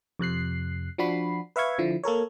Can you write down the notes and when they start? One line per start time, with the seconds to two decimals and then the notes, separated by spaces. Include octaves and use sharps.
0.19 F2 C3 F#6 C7
0.98 F3 D4 F#4 B5 C7
1.56 B4 E5 F5 C#6 G#6
1.79 D3 F3 E4
2.04 A#3 A4 A#4 C#5